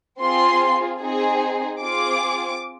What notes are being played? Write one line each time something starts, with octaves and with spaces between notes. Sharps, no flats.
C4 F4 G#4 C6
C4 D#4 G#4
C4 F4 G#4 D6